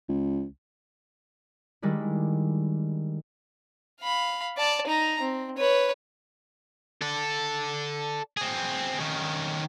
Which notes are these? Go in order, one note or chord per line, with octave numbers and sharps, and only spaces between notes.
C#2
D#3 G3 G#3 D4 E4
F5 B5
D5 A5
D#4 A#5
C4
B4 C#5
A4 D5
C4 G#4
D#3 C#4